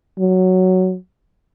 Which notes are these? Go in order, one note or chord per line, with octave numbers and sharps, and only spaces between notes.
F#3